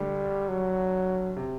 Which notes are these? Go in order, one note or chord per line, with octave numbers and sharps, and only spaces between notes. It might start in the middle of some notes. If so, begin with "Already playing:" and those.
Already playing: D2 D3 G3 A3
F#3
C3